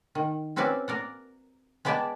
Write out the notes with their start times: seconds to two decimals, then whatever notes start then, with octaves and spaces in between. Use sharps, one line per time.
0.15 D#3
0.56 C4 C#4 F#4 B4 D5 E5
0.88 A#4 D5 F#5
1.85 G#3 B3 B4 D5 G5 A5